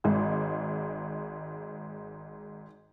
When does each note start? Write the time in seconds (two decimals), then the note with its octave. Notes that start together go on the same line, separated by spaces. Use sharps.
0.04 G#1 G#2